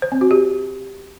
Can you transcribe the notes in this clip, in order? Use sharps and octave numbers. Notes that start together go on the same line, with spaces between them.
C5
C4
F#4
G4